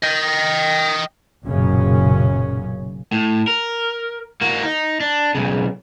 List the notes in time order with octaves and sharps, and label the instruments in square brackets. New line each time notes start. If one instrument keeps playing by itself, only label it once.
[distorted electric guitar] D#5 G5
[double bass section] F#1 B1 F#2 A#2 C#3 C#4
[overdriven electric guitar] A2
A#4
A#3 F#4
D#4
D4
B1 C#3